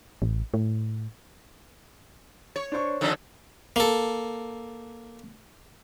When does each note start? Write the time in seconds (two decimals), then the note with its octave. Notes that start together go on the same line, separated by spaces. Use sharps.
0.22 A1
0.54 A2
2.56 C#5
2.72 D4 C5 C#6
3.01 F2 D3 D#3 A4 D5
3.76 A#3 A4